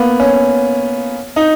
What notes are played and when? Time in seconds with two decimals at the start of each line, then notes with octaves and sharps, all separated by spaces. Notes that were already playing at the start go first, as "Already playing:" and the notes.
Already playing: A#3 B3
0.20 C#4
1.36 D#4